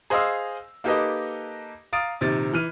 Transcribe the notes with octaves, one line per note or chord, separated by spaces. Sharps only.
G#4 C5 D#5 F5 C6 E6
A#3 D#4 G4 A4 B4 D#5
F5 A#5 D#6 A6 D7
A#1 C3 D#3 A6
E3 F6 D#7